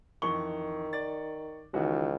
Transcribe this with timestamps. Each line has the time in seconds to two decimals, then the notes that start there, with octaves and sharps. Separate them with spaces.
0.22 F2 D#3 E3 C#6 G7
0.93 D5 A6
1.74 C#2 D#3 E3 F#4